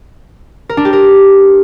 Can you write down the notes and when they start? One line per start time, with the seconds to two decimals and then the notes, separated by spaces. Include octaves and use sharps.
0.69 A#4
0.77 D4
0.85 G4
0.93 A#4